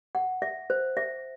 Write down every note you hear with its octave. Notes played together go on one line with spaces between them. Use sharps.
F#5
E5
C5
E5